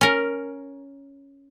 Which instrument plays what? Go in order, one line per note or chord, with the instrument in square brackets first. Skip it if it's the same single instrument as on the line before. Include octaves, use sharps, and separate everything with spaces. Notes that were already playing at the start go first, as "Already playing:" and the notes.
[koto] C#4 A#4